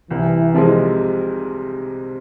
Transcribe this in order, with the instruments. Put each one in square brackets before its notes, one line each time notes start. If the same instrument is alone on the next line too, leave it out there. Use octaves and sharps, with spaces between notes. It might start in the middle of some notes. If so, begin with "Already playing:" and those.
[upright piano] C2 [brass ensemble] E3
[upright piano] C3 F3 G#3